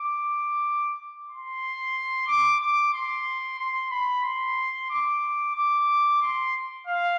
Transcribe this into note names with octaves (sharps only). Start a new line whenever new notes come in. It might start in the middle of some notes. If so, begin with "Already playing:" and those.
Already playing: D6
C6
D6
D6
C6
C6
B5
C6
D6
D6
C6
F5